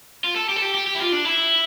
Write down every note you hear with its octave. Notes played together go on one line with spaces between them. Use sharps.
F4
A4
G4
A4
G4
G4
G4
E4
F4
D4
E4